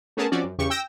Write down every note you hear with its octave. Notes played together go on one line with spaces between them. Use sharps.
A3 B3 C#4 G#4 A#4 A5
F3 C4 C#4 F#4 D5
F#2
E2 C#3 G4 C#6
G5 E6 G6 A#6